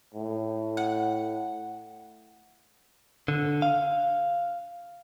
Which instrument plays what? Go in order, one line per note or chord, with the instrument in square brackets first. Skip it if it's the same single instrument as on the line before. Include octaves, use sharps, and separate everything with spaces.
[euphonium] A2
[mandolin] F#5
[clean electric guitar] D3
F5